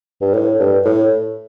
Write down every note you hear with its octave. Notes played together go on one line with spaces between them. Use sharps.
G2
A2
G2
A2